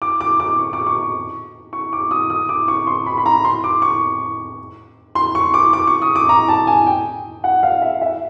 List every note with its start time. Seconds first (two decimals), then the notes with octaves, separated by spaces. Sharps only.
0.02 D6
0.21 D6
0.40 D6
0.59 C#6
0.73 D6
0.87 C#6
1.73 C#6
1.93 D6
2.11 D#6
2.30 D#6
2.49 D6
2.68 C#6
2.87 C6
3.06 B5
3.17 B5
3.26 A#5
3.45 C6
3.64 D6
3.82 C#6
5.15 C6
5.35 C#6
5.54 D6
5.73 D6
5.87 C#6
6.02 D#6
6.15 D6
6.29 A#5
6.48 A5
6.67 G#5
6.87 G5
7.44 F#5
7.63 F5
7.81 E5
8.01 E5